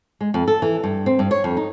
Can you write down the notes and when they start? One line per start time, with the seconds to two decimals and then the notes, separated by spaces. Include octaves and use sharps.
0.21 G#3
0.34 F2
0.48 A4
0.62 E3
0.84 G2
1.06 C4
1.19 G2
1.31 C#5
1.44 F2
1.57 D#4